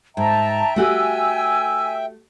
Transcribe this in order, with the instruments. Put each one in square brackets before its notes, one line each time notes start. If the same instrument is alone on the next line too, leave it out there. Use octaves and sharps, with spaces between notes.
[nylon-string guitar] G#2 [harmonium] E5 G5 [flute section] A5 A#5
[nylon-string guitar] A3 F#4 G4 [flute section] G#5 E6